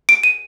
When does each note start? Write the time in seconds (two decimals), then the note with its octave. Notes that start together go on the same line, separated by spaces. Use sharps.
0.09 D7
0.24 D#7